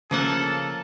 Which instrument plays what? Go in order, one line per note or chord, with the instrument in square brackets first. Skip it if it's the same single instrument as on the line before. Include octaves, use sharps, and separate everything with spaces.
[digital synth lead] C#3 [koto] F3 A#3 F#5 [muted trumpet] A4